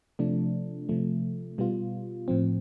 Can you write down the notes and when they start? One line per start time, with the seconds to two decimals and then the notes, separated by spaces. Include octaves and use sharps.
0.19 C3 F3 A3 D4
0.89 C3 F3 A3
1.58 B2 G3 B3 F4
2.28 A2 F3 C4